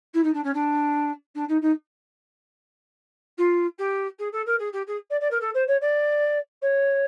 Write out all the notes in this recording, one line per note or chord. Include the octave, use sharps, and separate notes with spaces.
E4
D#4
D4
C#4
D4
D4
D#4
D#4
F4
G4
G#4
A4
A#4
G#4
G4
G#4
D5
D5
A#4
A4
C5
C#5
D5
C#5